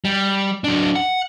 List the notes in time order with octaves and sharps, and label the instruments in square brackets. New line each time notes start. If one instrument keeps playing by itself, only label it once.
[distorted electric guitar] G3
F#3 D4
F#5